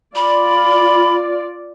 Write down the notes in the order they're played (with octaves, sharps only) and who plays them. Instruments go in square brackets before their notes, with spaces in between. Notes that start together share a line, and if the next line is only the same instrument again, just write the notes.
[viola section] F4 D5 [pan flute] B5